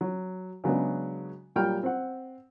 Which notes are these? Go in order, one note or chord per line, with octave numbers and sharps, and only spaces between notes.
F#3
C#3 F#3 G#3 B3 D4
A#2 F#3 G3 G5 F6
C4 F#5